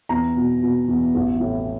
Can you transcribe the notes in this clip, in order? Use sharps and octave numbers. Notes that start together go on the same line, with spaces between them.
E2 A#5
B2
B2
E2
A1
A2